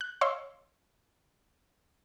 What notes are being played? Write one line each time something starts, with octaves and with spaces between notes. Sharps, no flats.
F#6
C#5 D#5 F5 C6 C#6 E6